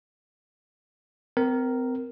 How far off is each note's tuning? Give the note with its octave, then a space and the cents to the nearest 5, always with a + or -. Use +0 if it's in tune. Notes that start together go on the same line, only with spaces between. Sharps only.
C4 -35 A#4 +0